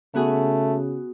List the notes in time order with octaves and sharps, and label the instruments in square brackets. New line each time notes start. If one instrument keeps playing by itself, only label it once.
[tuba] C#3 [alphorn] A3 [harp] B3 F#4 G#4